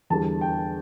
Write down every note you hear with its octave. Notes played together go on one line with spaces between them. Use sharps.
E2 D3 G3 A5
G5